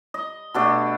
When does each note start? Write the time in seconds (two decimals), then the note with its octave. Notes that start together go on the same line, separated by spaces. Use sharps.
0.14 D#5
0.54 B2 A3 D4